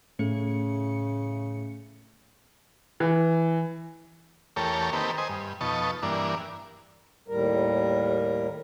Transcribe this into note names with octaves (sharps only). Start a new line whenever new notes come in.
A2 C#3 A3 C#7
E3
E2 A3 G4 A4 A#4 C#5
D#3 A#3 C4 G4 A4 B4
C5 D#5 G#5
G2
F2 B2 D#4 A5 C#6
G2 E3 A#3 D4
D#2 A2 G3 A#4